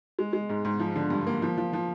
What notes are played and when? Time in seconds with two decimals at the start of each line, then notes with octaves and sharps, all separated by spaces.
0.19 G#3
0.33 G#3
0.49 G#2
0.65 G#2
0.80 F3
0.96 D3
1.10 G2
1.27 A#3
1.42 F3
1.58 F3
1.73 F3